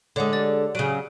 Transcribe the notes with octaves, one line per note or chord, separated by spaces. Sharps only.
D3 G#3 C#5 F#5 D6
G4 D5 A6
C#3 F#3 D7 D#7